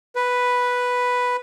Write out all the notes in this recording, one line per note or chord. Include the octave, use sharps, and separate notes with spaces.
B4